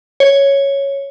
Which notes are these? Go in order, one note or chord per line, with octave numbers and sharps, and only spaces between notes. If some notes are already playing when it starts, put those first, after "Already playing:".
C#5